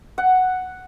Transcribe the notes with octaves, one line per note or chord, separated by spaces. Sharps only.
F#5